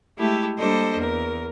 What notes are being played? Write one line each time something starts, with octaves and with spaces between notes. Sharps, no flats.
G#3 A3 E4 G4 A4
G3 A#3 D4 A4 C5 D#5
E2 A#4